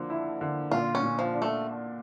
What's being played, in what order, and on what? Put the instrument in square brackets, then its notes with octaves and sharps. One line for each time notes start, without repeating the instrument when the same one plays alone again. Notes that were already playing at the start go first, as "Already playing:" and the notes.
Already playing: [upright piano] D3 F3 A#3
E4
D3
[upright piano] A#2 [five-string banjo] F4
[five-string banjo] C#4
[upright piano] A#2
[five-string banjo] F3
[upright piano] D4
[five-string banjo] A3